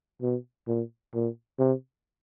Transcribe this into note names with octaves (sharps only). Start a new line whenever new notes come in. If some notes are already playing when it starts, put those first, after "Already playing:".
B2
A#2
A#2
C3